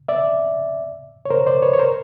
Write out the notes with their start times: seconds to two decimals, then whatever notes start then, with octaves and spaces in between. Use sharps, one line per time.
0.08 D5 E5
1.25 C#5
1.31 A#4 C5
1.47 C5 D5
1.62 B4 C#5
1.74 C#5
1.79 A#4 C5